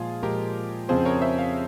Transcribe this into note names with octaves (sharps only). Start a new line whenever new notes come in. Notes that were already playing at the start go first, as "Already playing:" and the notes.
Already playing: A#2 F3 G#3 F4 G#4
A#2 F3 G#3 G4 A#4
F2 C#3 F3 C4 G#4 C5
A#4 C#5
C5 E5
C#5 F5